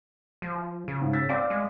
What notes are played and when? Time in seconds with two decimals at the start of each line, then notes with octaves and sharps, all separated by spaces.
0.42 F3
0.88 C#3
1.02 G#2
1.13 E6 A6 B6
1.29 C4 D5 F5 D6
1.50 G#3